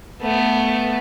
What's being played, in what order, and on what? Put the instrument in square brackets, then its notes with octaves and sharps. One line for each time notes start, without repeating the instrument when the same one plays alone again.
[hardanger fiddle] A3 B3